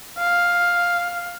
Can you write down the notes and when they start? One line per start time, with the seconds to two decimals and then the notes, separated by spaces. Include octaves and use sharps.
0.18 F5